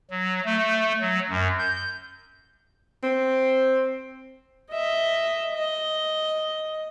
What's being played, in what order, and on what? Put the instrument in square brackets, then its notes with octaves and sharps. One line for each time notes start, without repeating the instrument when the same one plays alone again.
[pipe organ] F#3
A3
F#3
F#2
G6
[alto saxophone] C4
[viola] D#5 E5
D#5